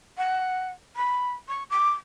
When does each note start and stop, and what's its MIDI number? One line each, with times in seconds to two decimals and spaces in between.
0.17 0.67 78
0.96 1.31 83
1.48 1.63 85
1.70 1.90 86